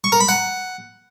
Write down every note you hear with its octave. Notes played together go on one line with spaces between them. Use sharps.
C#6
A#4
B5
F#5